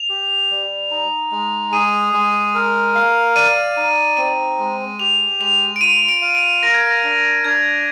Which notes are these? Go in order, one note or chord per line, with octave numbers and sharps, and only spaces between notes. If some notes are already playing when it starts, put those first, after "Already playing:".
Already playing: F7
G4
G3
D#4
G#3
G#4 D#7
G#3
A#4
F5
D5 D#7
D#4
C4 D#7
G#3
G4 F7
G#3 F7
D7
F4 D#7
D7
F5
D7
A#4 A#6
G#6
A#6
D4
D4 G#6